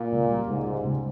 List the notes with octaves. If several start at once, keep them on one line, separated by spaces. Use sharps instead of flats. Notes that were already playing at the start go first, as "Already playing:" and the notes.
Already playing: A#2
C#2
G3
C#2 G#2
G3
C#2